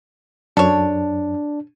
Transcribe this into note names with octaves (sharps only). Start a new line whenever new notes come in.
F#2 D4 A4 C#5